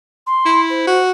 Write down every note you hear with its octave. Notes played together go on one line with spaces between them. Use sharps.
C6
E4
C5
F#4